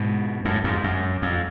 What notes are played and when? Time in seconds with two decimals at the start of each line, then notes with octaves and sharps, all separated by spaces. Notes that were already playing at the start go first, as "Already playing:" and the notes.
Already playing: G#2 B2
0.45 F#2 A2
0.64 F2 G#2
0.84 F#2
1.22 F2